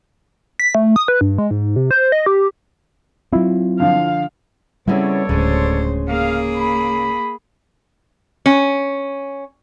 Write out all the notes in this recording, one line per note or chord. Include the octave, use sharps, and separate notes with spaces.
B6
A3
D#6
B4
G2
G#3
G#2
C3
C5
D#5
G4
F#3 C4 E4 F4
D3 F3 F5
C#3 G3 B3 C4 E4 A4 C#5 D5
D1 D2 C#3 G#3 C5
A#3 G#4 F5
B5
C#4